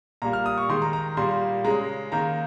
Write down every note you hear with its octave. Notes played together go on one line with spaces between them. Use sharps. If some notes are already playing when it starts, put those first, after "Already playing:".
A#2 G3 A#3 A#5
F6
D#6
C#6
D#3 G#3 C6
A#5
A#5
A#2 G3 A#3 C6
C#3 G#3 A#5
D#3 A#3 A#5